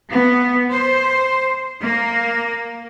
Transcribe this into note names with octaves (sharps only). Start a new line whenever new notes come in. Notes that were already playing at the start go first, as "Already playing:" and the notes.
B3
C5
A#3